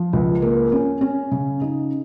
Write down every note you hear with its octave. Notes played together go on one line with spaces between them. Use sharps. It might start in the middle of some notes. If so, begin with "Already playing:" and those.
Already playing: F3
C#2
A#3
C#4
C#4
C#3
D#4